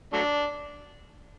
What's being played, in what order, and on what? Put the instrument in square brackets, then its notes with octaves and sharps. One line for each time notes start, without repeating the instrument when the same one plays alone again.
[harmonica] F#3 A3 D4